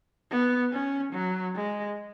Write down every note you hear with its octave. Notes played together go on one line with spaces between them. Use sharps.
B3
C#4
F#3
G#3